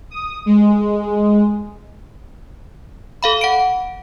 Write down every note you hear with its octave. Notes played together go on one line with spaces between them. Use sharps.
D#6
G#3
A4 F5 B5
F#5 D7